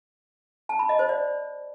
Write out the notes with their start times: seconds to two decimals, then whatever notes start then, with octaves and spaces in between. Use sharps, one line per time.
0.69 A5
0.79 B5
0.89 D#5
0.99 C5
1.09 D5